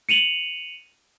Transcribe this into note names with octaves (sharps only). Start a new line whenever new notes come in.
C#7 D#7 F7 F#7